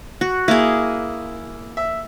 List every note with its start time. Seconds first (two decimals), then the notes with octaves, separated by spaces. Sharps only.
0.21 F#4
0.48 A#3 E4 G#4
1.77 E5